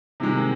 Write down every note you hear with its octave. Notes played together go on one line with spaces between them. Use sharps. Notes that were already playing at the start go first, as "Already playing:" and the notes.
C3 D#3 G#3